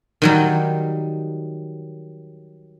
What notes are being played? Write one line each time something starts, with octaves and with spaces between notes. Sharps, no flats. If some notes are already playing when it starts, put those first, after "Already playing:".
D#3 F#3 G3